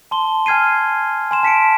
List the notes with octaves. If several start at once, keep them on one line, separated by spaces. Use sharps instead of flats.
A5 C6 G7
G#5 F6 G#6 C7 D#7
G#5 C6 E7
A5 B6 C#7 D7